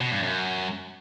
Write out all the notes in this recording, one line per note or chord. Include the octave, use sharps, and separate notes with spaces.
B2
G2
F#2